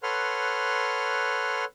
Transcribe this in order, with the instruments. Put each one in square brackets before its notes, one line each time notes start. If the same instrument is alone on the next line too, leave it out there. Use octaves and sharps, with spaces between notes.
[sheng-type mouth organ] A4 B4 C#5 F#5 C6 F6